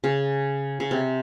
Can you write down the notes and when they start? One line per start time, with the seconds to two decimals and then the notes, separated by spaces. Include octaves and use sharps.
0.04 C#3
0.80 C#3
0.91 C3